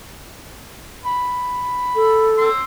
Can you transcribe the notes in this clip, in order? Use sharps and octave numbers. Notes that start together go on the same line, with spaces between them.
B5
A4
C6 E6